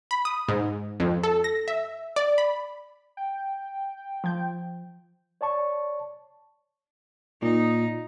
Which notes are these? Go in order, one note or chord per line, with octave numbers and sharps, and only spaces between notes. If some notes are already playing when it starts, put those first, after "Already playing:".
B5
D#6
G#2
F2
A4
A#6
E5
D5
B5
G5
F3 G6
C#5 D5 A5 C#6
A#2 D#4